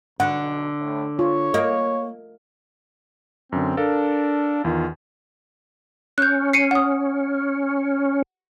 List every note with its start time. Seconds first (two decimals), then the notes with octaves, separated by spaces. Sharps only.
0.20 B1 D3 F#5
0.80 A2
1.19 F4 C#5
1.54 A#3 D#5
3.52 F#2 D3 C4
3.77 D4 A4 A#4 F5
4.65 E2 D#3 F4
6.18 C#4 F#6 G6
6.53 C7 C#7 D#7
6.71 F#5 D#6